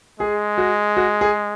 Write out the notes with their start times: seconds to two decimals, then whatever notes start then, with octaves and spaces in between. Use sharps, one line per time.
0.20 G#3 G#4
0.58 F#4
0.97 F#4
1.21 G#4